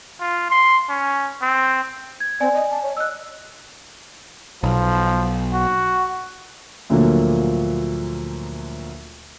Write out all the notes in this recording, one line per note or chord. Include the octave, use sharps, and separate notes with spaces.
F4
C6
C#4
C4
G#6
C4 D5 G#5
D#5
A5
C#5
D#5 E6 F#6
B1 F3
F#4
D2 A#2 D3 F3 F#3 A#3